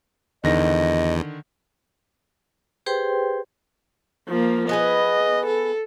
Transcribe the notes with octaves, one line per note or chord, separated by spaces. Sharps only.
E2 D3 D#3 D#5 A#6
G4 G#4 B4 C5 G5 C6
F3 A#3
B3 G#4 B4 D#5
A4